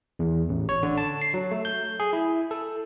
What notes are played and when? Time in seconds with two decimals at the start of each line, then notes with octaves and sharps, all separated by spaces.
0.19 E2
0.49 A1
0.69 C#5
0.83 D3
0.97 A5
1.22 C7
1.34 F#3
1.51 A3
1.65 G6
2.00 G#4
2.13 E4
2.51 A4